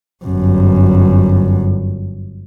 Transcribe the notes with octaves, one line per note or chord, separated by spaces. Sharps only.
G1 F#2